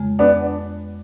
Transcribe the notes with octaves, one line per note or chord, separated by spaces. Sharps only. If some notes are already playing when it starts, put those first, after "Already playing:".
Already playing: F2 C#3 G#3
B3 D4